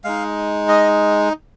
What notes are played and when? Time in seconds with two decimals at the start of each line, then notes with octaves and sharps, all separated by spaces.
0.04 G#3 D#4 F5
0.68 D#5